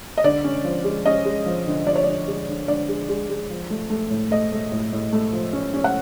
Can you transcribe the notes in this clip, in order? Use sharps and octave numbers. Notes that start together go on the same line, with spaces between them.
D#5
D3 D5
C#4
F3
G#3
C#4 D#5
G#3
F3
D3
F3 D5
C#5
D3 D5
G#3
D3
D3 D5
G#3
G#3
G#3
F3
A3
A3
A2
A3 D#5
A3
A2
A2
A3
F3
C#4
C#4
F#5